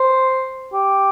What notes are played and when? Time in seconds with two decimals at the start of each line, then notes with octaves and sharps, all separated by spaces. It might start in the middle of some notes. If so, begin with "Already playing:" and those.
Already playing: C5
0.73 G4